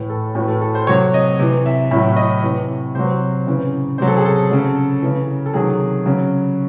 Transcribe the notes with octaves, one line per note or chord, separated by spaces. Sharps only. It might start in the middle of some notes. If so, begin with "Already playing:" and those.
Already playing: A2 E3
A4
A2 E3 F#4
A4
A4
C5
C3 F#3 C#5
D#5
C3 E3
E5
A2 F#3 E5
D#5
C3 E3
C3 F#3 C5
C#3 E3
C3 F#3 C5
A4
G#4
A4
C#3 F#3
C#3 E3
A4
C3 D#3 F#3 G#4
C#3 F#3